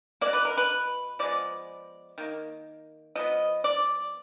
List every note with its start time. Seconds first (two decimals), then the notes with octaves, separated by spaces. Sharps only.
0.21 B2 A#3 D5
0.33 B4
0.45 A#4
0.57 B4
1.19 F3 G#3 B3 D5
2.18 D#3 A#3
3.16 F3 B3 D#5
3.64 D5